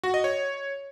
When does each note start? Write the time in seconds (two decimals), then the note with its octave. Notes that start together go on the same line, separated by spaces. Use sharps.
0.04 F#4
0.14 D#5
0.24 C#5